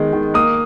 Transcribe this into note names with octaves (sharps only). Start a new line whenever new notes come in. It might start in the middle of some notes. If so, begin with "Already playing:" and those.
Already playing: D#3 G#3 B3
D#3
A#3 D#6